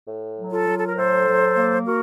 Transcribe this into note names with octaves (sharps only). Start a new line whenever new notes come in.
A2
F#3
F4 A4
F#3
A4
A#4
A2 A4 C5
F#3
A#3
F#4 A#4